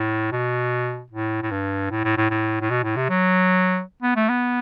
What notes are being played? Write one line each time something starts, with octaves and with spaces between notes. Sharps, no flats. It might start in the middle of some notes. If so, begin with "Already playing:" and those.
Already playing: A2
B2
A2
A2
G2
A2
A2
A2
A2
A2
B2
A2
C3
F#3
B3
A3
B3